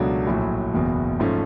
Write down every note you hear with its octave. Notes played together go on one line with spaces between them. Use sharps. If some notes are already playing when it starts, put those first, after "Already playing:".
Already playing: C#2 B2 F#3 A3 D4
A#1 A2 F#3
F#1 E2 B2
G#2 F3 A3 C#4